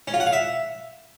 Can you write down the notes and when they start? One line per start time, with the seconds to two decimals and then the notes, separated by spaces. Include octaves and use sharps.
0.08 C#4
0.14 F4
0.20 F#5
0.26 F5
0.33 E5